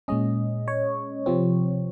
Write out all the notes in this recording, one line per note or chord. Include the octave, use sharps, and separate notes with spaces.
A#2 G#3 C#4 D#5
C#5
C3 F3 C4